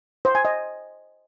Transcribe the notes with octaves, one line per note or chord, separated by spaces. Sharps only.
C5
G#5
D#5